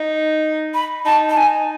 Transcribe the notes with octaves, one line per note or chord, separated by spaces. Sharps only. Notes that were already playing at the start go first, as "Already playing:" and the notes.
Already playing: D#4
B5
D#4 A5
A5
D#4 G#5